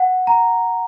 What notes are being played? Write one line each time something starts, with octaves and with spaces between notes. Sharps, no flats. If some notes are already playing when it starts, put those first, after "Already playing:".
Already playing: F#5
A#5